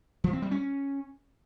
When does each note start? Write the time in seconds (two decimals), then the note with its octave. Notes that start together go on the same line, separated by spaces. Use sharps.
0.24 F3
0.33 C4
0.42 G3
0.51 C#4